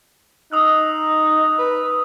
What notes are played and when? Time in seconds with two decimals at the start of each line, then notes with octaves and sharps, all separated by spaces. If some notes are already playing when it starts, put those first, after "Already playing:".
0.52 D#4 D#6 E6 F#6
1.59 B4